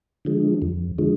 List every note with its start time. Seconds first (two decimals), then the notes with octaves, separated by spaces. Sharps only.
0.25 D3 F3 G#3
0.62 F2
0.98 D3 F3 G#3